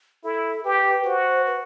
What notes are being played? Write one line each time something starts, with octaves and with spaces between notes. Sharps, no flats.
E4 A4
G4 B4
F#4 C5
B4